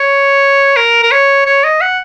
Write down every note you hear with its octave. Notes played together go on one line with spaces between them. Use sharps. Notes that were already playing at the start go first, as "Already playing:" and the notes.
Already playing: C#5
A#4
A#4
C#5
C#5
D#5
F#5